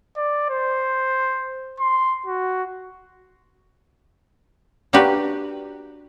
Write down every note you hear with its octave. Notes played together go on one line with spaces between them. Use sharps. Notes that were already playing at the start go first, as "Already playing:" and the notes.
D5
C5
C6
F#4
A#3 D4 F#4 G4 B4